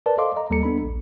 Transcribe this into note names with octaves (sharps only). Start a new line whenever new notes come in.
A#4 B4 D5 A5
A4 C5 D#5 F5 C6 D6
D#5 A#5
D#2 G3 A#3 A4 A#5 C#7
B3 D4 A4 B5
A#1